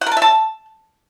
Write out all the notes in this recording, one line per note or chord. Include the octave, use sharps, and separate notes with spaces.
F#5
A#4
A5
E5
A5